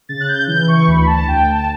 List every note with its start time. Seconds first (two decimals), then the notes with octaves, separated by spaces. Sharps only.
0.09 C#3 A6
0.20 F#6
0.28 G6
0.47 E3 G6
0.68 C#6
0.87 D2 B5
1.07 A5
1.27 D2 G5
1.47 A5